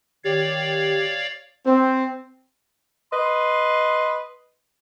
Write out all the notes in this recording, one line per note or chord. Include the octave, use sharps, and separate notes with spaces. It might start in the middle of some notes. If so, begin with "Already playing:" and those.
D#3 G4 C#5 D5 F5
C4
B4 D#5 C6